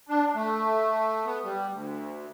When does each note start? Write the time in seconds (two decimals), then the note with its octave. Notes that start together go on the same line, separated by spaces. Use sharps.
0.09 D4
0.35 A3
1.25 B3
1.44 G3
1.71 D2